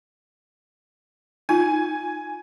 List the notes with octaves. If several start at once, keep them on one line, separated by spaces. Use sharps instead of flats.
D#4 F4 G#5